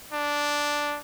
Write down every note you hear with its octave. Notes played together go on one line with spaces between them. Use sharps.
D4